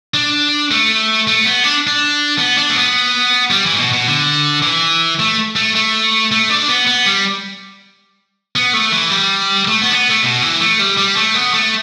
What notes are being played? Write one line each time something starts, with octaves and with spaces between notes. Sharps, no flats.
D4
A3
A3
B3
D4
D4
B3
D4
A3
B3
G3
E3
A2
B2
B2
D3
E3
A3
A3
A3
A3
D4
B3
B3
G3
B3
A3
E3
G3
A3
B3
D4
B3
A3
B2
E3
A3
G3
G3
A3
B3
A3